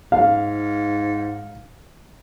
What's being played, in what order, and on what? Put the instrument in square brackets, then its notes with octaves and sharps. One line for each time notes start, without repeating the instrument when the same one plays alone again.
[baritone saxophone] G#2 [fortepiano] F5